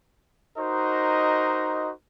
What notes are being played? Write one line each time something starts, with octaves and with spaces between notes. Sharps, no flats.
D#4 F#4 A#4 C5 D#5